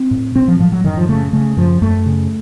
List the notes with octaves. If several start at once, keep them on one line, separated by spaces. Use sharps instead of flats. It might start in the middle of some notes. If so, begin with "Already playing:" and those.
Already playing: C4
A2
A2 C4
F3
A2 F3
F#3
F#2 D#3
F3
C#3 A3
C#3 A3
F#2 F3
F#2 A3
C#3